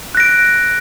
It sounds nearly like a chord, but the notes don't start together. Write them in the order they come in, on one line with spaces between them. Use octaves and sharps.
F#6 A#6 D7